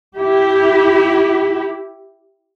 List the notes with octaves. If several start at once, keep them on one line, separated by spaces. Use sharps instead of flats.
E4 G4